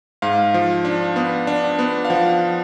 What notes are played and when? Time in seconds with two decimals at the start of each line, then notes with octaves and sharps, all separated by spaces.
0.22 G#2 F5
0.54 F3
0.85 D4
1.16 B3
1.47 D4
1.79 B3
2.05 F5
2.10 F3 F#5